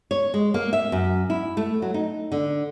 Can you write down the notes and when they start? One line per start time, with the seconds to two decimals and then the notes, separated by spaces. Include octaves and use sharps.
0.11 C#5
0.34 G#3
0.54 A#3
0.73 E5
0.92 F#2
1.30 E4
1.57 A3
1.82 F#3
1.94 D#4
2.32 D3